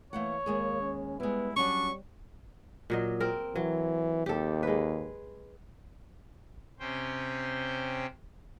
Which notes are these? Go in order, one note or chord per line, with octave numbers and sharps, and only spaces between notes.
E3 A3 A#3 C#5 F#5
D#2 G#3 A#3 G#4
C#4
G3 G#3 B3 E4
F#3 G3 C#4 D4 C#6
A#2 F#3 D#5
C4 A#4
E3 F#3
D#2 G4 A4
G#3 B4
C3 C#4 C5 G5